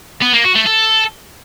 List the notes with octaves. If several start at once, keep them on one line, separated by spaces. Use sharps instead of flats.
B3
A#3
F#4
A3
A4